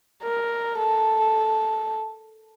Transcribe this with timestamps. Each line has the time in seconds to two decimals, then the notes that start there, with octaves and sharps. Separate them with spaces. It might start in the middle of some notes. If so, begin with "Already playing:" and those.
0.24 A#4
0.79 A4